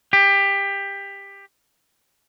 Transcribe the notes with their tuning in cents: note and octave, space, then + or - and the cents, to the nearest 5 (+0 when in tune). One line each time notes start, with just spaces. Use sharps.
G4 +20